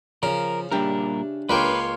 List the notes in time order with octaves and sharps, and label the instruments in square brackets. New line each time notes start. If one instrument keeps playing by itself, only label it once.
[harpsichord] C#3 [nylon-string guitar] F3 [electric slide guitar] A#4
[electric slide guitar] A#2 G3 A#4 [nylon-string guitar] D4 G4 E5
[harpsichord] C#2 A#3 G5 [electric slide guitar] B4 [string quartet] C#5 F5 C6